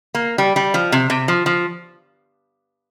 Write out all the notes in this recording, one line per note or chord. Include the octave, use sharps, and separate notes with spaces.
A#3
G3
G3
F3
C3
C3
F3
F3